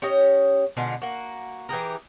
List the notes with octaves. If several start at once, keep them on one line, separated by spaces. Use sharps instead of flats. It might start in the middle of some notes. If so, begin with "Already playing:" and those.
C#4 G4 C#5 D#5
B2 D3 G#3 F4
A#3 F#4
E3 G4 G#4 A#4